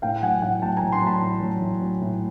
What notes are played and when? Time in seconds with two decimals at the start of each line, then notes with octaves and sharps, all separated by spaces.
0.02 A2 F5 G5
0.22 F#3 F#5 G#5
0.42 A2 F#5 G#5
0.62 F#3 G5 A5
0.77 G#5 A#5
0.82 A2
0.92 A#5 C6
1.02 F#3 A5 B5
1.22 A2
1.41 F#3
1.62 A2
1.81 F#3
2.01 A2